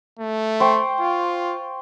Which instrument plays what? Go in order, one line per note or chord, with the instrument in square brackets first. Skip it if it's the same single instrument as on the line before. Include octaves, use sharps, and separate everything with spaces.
[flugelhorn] A3
[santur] C5 G5 C#6
[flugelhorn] F4